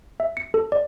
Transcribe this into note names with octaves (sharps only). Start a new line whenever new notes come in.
E5
C#7
A4
D5